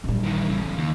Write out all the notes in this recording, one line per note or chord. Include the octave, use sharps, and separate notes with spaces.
A#1 G3
D#3 E3
C#3 E3
D#4
D#2